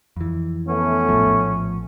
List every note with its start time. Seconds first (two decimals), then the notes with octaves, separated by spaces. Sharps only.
0.17 F2 E3
0.67 A3 B3 C#4
1.09 A#1 A2 F3